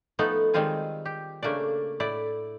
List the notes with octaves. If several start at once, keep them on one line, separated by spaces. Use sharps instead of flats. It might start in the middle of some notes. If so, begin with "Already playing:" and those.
F3 A3 B3 D#4 A4
D#3 G3 G#3 C4 F4 G#5
G4
C#3 A3 A#3 D4 D5
A2 E4 D5